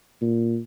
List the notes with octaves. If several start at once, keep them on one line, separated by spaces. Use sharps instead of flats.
A#2